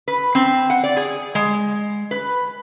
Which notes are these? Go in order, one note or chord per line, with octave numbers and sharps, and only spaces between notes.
B4
C4
F#5
D5
G#4
G#3
B4